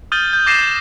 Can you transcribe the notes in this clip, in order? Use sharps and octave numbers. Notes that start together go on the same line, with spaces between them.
D#6 F6 G6 A6 D#7 G7
G6
D6 A6 A#6 C7 D#7 E7